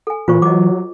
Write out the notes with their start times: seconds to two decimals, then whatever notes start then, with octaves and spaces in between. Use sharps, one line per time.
0.07 A4 G#5
0.28 A#2 E3 F4 C5 C#6
0.42 F#3 D#5 D6